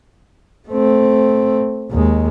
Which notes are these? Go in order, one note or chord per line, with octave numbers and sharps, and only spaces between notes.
A3 C4
D#2 G#3